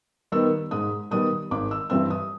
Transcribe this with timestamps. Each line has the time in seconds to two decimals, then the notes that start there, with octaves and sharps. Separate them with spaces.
0.32 D#3 G3 B3 E6
0.71 G#2 D#6
1.11 D#3 G3 B3 D#6
1.51 G#1 D6
1.71 E6
1.90 G2 E3 G3 C4 E6
2.10 D#6